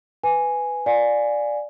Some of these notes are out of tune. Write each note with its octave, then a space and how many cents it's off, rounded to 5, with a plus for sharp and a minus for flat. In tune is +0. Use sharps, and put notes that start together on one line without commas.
B4 +10 G#5 +0
D5 +0 F5 +20 G#5 +0